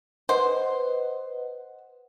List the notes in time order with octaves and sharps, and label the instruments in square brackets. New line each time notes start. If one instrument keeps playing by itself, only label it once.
[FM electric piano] B4 D#5 F#5 [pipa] C5